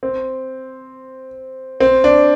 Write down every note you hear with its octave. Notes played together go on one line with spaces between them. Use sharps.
C4
C4
D4